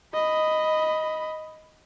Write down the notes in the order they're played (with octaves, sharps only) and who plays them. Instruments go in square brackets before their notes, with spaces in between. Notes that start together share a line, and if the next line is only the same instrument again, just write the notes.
[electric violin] D#5 B5